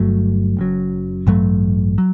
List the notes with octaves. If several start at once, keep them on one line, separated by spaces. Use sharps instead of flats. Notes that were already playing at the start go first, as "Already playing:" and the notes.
Already playing: G1 G2 F#3 A3
F#1 F#2 F#3
A1 G2 F#3 A3
F#3